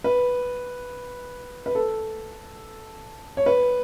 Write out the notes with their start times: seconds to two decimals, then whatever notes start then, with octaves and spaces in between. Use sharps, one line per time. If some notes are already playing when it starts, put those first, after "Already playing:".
0.04 B4
1.66 B4
1.75 A4
3.37 C#5
3.46 B4